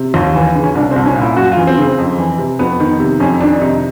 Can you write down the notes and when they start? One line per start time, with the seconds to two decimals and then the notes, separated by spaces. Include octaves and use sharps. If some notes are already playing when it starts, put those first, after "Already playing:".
Already playing: C3
0.14 D#2
0.35 E3
0.56 C#3
0.64 C#4
0.75 C2 D4
0.91 C2 C4
1.06 C#4
1.16 A#2
1.21 E4
1.36 F#2 F#4
1.52 E3 F4
1.67 C4
1.78 C#3 C4
1.98 F2
2.18 E3
2.38 C3
2.59 F2 B3
2.80 D#3
3.00 C3
3.20 F2 C#4
3.41 D#3 D4
3.61 C3 D#4